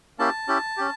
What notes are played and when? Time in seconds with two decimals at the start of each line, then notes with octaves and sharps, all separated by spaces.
0.19 A#3 C#4 E4 G4 A5
0.48 C#4 E4 G4
0.77 C#4 G4